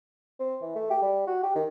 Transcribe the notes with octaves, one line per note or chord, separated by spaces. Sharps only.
C4
E3
A3
G4
G3
F#4
G4
D#3